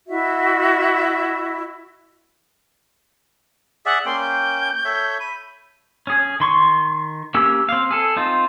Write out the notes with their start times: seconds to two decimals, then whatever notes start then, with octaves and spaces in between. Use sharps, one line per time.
0.08 E4 F#4 D#5 E5
3.86 G#4 D5 E5 F#5
4.06 A#3 C#4 G5 C6
4.21 G6
4.85 A4 C#5 E5
5.20 B5 D#7
6.07 C#4 G#4
6.40 D#3 C6 C#6
7.34 A#3 C#4 G4 A#4 E6
7.69 C4 F5
7.91 G#4 A4
8.16 C4 D#4 F4